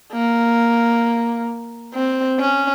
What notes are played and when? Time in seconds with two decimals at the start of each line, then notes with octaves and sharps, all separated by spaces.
0.13 A#3
1.94 C4
2.39 C#4